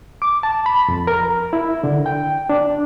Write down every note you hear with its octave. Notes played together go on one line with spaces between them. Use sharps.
D6
A5
B5
F2
A#4
E4
D3
G5
D4